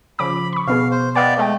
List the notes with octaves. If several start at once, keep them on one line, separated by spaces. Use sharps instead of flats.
C#3 F3 B5 D6
B5 C#6
B2 B3 G#4 F5
C5
B3 D5 D#5 F5 G5
G#3 A3 D#5 G5